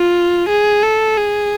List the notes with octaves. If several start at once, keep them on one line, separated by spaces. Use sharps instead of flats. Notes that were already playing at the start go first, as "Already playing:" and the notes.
Already playing: F4
G#4
A4
G#4